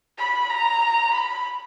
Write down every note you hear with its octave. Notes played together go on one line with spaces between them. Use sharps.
B5
A#5
B5